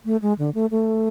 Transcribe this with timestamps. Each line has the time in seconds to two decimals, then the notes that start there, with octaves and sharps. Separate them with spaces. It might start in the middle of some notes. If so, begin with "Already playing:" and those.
0.05 A3
0.22 G#3
0.39 D3
0.55 A3
0.71 A3